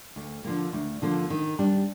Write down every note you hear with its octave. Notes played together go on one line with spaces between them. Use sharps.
D2
D3 F3 A#3
D2
D3 F3 A#3
D#3
G3 D4